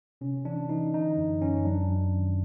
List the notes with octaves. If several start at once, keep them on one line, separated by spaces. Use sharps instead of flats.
C3 C#4
E3 D4
E3 D#4
D3 D#4
F#2
F#2 C#4
F#2 D4
F#2
D#3